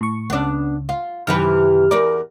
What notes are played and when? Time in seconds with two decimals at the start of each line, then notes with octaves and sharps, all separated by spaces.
0.01 A2 C#6
0.30 C#2 C#3 B3 D4
0.89 F4
1.27 F#2 C3 D#3 E3 B4 F6
1.91 E2 A#4 D5